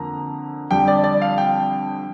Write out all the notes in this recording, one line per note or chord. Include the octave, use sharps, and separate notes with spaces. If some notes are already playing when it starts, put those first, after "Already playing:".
Already playing: F2 D3 A#3 A#5
F2 D3 G3 G5
D5
D5
F5
G5